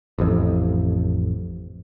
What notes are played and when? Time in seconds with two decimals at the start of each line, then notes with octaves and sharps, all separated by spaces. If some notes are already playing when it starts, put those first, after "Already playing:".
0.18 A1 F2